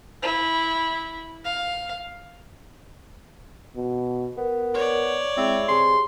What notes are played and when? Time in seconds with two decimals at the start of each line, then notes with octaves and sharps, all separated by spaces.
0.22 E4
1.44 F5
3.75 B2
4.38 B3 A#4
4.74 C#5 D5
5.37 G#3 C4 E4
5.68 C3 G#4 C6